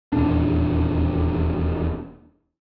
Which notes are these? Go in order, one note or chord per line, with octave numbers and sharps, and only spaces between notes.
D#1 E2 A#2 D4